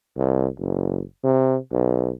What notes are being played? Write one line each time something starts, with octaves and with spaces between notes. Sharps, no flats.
C2
F#1
C3
B1